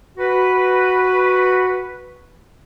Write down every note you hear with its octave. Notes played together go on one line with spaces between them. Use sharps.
F#4 B4